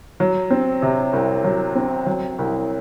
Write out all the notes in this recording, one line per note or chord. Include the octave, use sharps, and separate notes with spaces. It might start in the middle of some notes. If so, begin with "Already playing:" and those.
F#3
C4
C3
C2
F#3
C4
F#3
C2